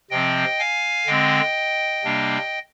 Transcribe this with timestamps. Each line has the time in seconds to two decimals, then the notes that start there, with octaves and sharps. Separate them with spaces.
0.10 C3 F3 C4 D#5 G5
0.59 F5 G#5
1.07 D3 G#3 C4 D#5 G5
2.04 C3 G3 A#3 D4